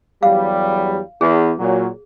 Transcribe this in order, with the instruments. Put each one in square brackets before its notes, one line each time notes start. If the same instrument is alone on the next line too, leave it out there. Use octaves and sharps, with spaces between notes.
[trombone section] E2 F#3 G3 [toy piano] F5
[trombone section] E2 [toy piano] G#4
[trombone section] A#2 F#3